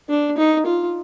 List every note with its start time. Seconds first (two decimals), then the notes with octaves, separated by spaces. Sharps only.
0.10 D4
0.38 D#4
0.66 F4